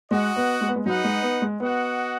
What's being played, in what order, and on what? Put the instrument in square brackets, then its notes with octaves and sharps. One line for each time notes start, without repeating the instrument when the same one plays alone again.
[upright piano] G#3 [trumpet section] F#4 D#5 F#5
[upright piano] B3
G#3
B3
G#3
[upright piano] F#3 [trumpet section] D#4 B4 D#5 F#5
[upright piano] G#3
B3
G#3
[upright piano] B3 [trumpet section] F#4 D#5 F#5